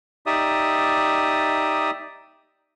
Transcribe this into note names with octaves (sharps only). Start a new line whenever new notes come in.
D#4 G4 D5 E5 D#6